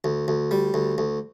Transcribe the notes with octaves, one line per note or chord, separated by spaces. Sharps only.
D2
D2
G3
D2
D2